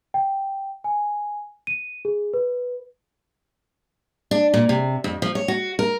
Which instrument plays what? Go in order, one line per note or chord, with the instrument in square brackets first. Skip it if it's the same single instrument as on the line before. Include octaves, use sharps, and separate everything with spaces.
[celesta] G5
G#5
D#7
G#4
B4
[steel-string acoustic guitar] D4
A#2
C3
F2
F3
C#5
F#4
A#4